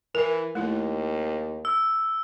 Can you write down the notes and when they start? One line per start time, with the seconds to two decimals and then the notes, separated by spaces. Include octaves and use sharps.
0.15 E3 A#4 E5
0.55 D#2 A3 E4
1.65 E6